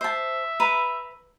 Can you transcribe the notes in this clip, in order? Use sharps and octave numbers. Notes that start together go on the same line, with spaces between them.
C5 E5 A5
B4 A#5 B5